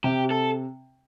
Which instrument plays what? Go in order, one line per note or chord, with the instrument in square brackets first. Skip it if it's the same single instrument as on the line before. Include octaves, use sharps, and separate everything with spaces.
[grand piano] C3 [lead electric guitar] G4
[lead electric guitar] A4